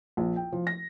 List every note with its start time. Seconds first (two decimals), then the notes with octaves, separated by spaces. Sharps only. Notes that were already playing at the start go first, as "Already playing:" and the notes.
0.17 A#1
0.36 G5
0.52 F3
0.67 A#6